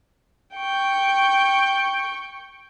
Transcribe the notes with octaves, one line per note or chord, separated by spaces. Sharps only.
G5 C#6